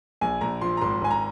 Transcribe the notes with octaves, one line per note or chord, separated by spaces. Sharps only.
A#1 G#5
A#1 A#5
F3 C6
A#5
G#1 C6
G#1 G#5
A#5